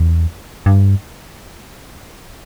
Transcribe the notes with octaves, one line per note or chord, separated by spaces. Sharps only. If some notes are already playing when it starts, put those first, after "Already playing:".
Already playing: E2
G2